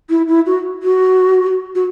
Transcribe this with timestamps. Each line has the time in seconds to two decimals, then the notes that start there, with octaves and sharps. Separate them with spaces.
0.10 E4
0.28 E4
0.46 F#4
0.83 F#4
1.75 F#4